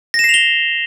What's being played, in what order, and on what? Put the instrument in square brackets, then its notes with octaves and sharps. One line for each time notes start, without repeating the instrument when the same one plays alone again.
[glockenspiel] A#6
E7
C7
F7
G7